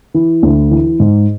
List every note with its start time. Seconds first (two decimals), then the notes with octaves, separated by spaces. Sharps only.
0.14 E3
0.43 D2
0.71 E3
1.00 G#2